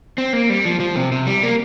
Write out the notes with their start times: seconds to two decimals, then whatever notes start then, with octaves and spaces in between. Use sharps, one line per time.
0.18 C4
0.33 A#3
0.50 G3
0.65 F3
0.80 F3
0.96 C3
1.12 C3
1.27 G3
1.43 A#3